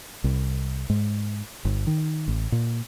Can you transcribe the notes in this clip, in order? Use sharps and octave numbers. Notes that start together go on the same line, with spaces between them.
C2
G#2
G1
D#3
A1
A#2